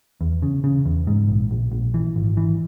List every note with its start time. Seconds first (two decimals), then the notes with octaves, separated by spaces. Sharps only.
0.21 E2
0.42 C#3
0.64 C#3
0.86 E2
1.07 G#2
1.28 A#1
1.51 A#1
1.72 A#1
1.94 E3
2.16 G#1
2.37 E3